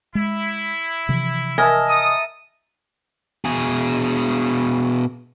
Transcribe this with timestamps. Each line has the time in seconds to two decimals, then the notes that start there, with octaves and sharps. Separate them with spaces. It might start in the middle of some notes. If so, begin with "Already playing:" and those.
0.15 G#3 E4
1.09 C3 E3 F3
1.58 A#4 D#5 E5 G#5 A5
1.89 A4 D#6
3.45 B2 G#4